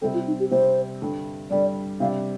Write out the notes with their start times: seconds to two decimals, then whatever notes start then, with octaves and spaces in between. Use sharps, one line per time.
0.02 C3 G3 C4 A4
0.14 F4
0.27 D#4
0.40 G4
0.51 C3 G3 C4 C5
1.02 G2 D3 G3
1.51 G2 D3 G3 D5
2.00 C3 G3 D4 F5